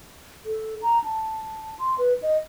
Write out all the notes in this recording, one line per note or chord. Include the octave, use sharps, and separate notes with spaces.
A4
A#5
A5
C6
B4
D#5